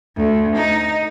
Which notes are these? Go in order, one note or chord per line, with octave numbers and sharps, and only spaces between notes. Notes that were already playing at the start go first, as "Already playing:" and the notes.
D2
D#4